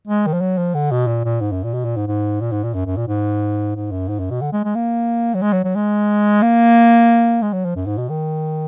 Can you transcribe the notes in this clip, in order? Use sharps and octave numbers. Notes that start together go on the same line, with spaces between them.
G#3
D#3
F3
F#3
F3
D3
B2
A#2
A#2
G#2
F#2
A#2
B2
A#2
G#2
G#2
A#2
G#2
A#2
F#2
F#2
A#2
G#2
G#2
F#2
G#2
F#2
B2
D3
G#3
G#3
A#3
F#3
G#3
F#3
F#3
G#3
A#3
G#3
F#3
F3
F#2
G#2
B2
D#3